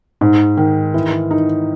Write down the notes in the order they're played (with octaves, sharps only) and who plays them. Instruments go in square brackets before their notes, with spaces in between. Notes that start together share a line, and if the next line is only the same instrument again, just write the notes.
[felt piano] G#2
D#3
E3
D#4